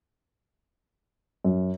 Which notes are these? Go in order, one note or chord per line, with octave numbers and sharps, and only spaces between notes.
F#2